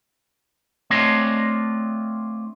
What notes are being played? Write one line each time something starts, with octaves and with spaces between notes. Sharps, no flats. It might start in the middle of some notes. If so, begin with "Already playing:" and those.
A3 C4 D4 F4 C#5 D#5